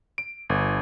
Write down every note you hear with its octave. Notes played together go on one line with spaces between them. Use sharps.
D7
G1